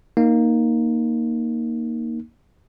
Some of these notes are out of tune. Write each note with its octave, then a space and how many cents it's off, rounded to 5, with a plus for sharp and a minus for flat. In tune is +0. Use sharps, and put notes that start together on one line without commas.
A#3 +0 D#4 +0